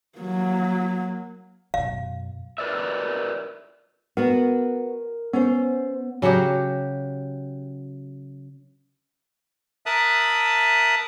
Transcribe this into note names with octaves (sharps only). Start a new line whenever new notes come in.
F#3 A#3
F#2 B2 F5
A#4 B4 D5 E5
B3 F#4 A#4
B3 C#4 C5
C#3 F#3 F#4 G4
A#4 E5 A5 D#6 F#6